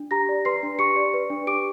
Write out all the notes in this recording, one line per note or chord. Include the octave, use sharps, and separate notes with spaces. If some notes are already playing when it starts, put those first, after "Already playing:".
Already playing: D4
G4 A#5 A#6
D5
B4 C6 C7
D4
G4 C#6 C#7
D5
B4
D4
G4 D6 D7